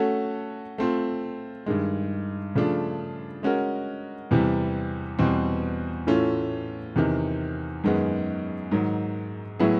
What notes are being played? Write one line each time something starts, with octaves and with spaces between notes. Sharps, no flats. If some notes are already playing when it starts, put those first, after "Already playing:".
Already playing: A3 C#4 F#4 A4
A3 C4 F4
G2 D#3 G#3
C#3 F3 A3 D4 F4
G#3 C#4 F#4 A#4
E2 C3 E3 G3
E2 B2 G3 C4
A2 E3 A3 C#4 F4
E2 C3 D#3
F#2 D#3 G#3 B3
G#2 D#3 F#3
A2 F#3 B3 E4 G#4